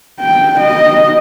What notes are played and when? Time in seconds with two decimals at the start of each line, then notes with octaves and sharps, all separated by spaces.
0.20 G5
0.60 D#5